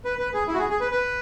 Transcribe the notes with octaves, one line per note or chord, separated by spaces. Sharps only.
B4
B4
G#4
E4
F#4
G#4
G#4
B4
B4